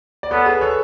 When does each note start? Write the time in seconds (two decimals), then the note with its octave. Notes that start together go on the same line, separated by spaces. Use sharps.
0.23 D5
0.31 B3 A4 C#5
0.46 G#4 B4
0.61 A4 C#5